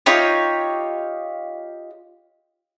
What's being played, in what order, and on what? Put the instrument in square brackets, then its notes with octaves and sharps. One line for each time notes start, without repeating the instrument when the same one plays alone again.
[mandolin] D#4 F4 G4 C#5